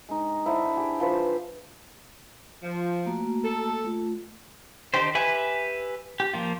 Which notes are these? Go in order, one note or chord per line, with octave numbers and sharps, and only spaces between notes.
G#3 D#4
D3 D4 E4 C5
G4 G#4
F3 B4 C5
F3
A3 A#3 F#4
A4
A3 F4
D3 D#3 D#4 G4 C5
G4 B4 E5 G#5 B5
G4
F3 A#3 F4